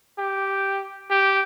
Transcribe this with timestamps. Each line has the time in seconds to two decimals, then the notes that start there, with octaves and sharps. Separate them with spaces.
0.18 G4
1.10 G4